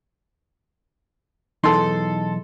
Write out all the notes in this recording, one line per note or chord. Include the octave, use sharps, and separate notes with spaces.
B1 E2 D#4 A4 C6